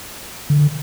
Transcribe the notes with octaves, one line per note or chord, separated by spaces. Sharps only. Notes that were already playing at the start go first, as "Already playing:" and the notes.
D3